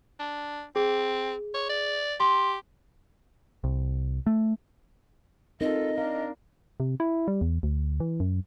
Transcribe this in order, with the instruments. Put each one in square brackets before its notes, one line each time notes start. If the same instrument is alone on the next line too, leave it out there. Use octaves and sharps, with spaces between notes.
[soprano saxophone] D4
[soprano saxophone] C4 [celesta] G#4
[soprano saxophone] C#5
D5
[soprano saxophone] G4 [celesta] C6
[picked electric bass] C2
A3
[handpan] C4 D#4 A#4 [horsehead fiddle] F4 A4 [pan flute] D#5
[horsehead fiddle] D4 A#4 [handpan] F5
[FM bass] C3
E4
G3
E2
D2
E3
F#2